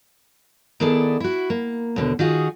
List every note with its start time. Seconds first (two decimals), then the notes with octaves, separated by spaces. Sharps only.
0.80 D#3 B3 E4 G#4 A4 D5
1.20 E4 F#4
1.50 A#3
1.96 D#2 B2 D3
2.19 D#3 F4 F#4 G#4